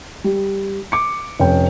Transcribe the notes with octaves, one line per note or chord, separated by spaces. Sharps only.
G3
D6 C#7
F1 C#4 G5